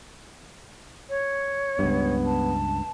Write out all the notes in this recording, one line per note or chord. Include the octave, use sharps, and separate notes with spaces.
C#5
C#2 G2 B3
A5